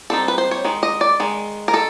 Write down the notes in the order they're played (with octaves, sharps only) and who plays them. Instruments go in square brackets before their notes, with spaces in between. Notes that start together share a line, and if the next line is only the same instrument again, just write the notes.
[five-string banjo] G3 C4 D#4 A4
B4
C5
C#5
D#3 G#3
D#5
D5
D#3 G#3
A#4
D#3 A4